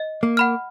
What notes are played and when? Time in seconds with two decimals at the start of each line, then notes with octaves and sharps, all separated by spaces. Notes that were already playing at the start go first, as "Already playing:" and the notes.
Already playing: D#5
0.23 A#3
0.37 F#5 B5 F6